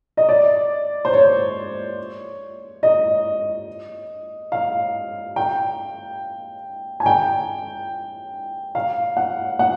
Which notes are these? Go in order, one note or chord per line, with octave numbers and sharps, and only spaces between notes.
D#5
D5
C5
C#5
D#5
F5
G5
G#5
G5
F5
F#5
F#5